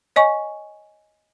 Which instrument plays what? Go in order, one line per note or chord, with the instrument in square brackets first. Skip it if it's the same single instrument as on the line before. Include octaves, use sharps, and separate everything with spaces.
[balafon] C#5 D#5 G#5 C#6